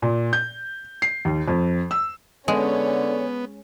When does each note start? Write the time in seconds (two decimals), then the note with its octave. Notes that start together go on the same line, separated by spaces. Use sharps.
0.02 A#2
0.33 G6
1.02 C7
1.25 D#2
1.48 F2
1.91 E6
2.48 D3 G#3 B3 C#4